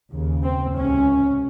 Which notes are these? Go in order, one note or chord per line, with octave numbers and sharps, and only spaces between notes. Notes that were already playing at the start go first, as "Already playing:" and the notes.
D#2 C#3
C4
C#2 C3 C#4